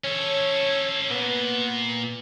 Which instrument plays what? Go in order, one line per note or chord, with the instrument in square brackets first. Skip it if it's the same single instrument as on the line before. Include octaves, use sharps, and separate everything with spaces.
[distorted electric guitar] C#4 A4 [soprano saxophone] C#5
[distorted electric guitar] A#2 [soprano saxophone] B3